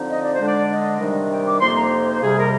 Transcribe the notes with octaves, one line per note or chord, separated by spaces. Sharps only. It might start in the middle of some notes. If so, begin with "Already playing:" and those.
Already playing: D3 F3 C4 D#4
D#5
D5
C5
D3 G#3 D4
D5
D#5
C3 D#3 G3 D4
G5
D6
F2 C3 F3 A#3 D#4 C6
A#5
C5
F2 C3 G3 G#4
A#4